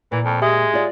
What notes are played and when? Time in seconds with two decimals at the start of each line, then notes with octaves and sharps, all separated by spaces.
0.12 A#2 E3
0.24 F2
0.42 G#3 G4 E5 D#6
0.73 F4 D5